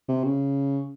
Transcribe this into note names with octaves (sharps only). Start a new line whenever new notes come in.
C3
C#3